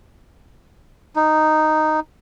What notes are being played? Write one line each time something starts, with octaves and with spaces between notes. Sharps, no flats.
D#4